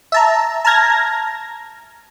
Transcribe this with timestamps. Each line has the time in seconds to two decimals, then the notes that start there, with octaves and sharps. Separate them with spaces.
0.12 E5 A5 A#5
0.65 A5 A#5 F6 G#6 A#6